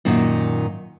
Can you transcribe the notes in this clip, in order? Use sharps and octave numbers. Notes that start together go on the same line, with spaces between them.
F#2 A#2 D#3